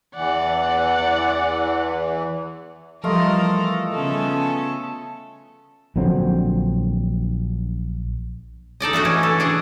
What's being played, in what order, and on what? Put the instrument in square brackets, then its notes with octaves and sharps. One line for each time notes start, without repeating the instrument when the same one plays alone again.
[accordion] E2 E3 [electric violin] D5 F#5
[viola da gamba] E3 A4 [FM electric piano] F3 G3 [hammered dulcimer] A3 F4 D#5 [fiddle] A#4
[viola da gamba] C#3 B3 C#4 [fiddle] A4
[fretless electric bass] A#1 D3 F#3 C4
[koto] D#4 A4 D5 D#5
A3 D4 F#4 D#5
E3 C#4
A4
D4 G#4 D#5